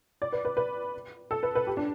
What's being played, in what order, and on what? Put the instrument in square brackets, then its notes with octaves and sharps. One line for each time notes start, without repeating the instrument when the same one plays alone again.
[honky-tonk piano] D5
B4
B4
B4
A4
B4
B4
G4
D4